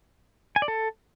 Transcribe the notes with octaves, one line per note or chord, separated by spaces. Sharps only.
G#5
D5
A4